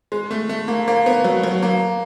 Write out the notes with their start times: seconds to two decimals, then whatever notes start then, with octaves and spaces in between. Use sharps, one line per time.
0.12 G#3
0.31 A3
0.49 A3
0.68 A#3
0.88 A#3
1.06 B3
1.24 F#3
1.43 F#3
1.62 A#3